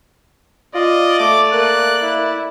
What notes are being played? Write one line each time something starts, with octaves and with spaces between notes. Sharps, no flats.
F4 D5 D#5
A3 D6
A#3 F#6
E4